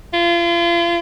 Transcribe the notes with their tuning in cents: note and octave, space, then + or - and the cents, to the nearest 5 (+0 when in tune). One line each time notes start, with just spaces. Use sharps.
F4 -35